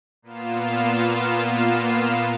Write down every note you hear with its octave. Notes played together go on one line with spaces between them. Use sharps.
A#2 A#3 B3 F4 F5 E7